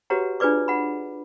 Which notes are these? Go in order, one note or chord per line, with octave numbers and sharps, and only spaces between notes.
F#4 G4 B4 C#5 F#5 A#5
D4 F4 G#4 B4 D5 D6
F#5 B5